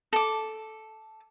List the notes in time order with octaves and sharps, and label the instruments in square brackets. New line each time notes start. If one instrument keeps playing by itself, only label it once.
[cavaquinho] A4 D6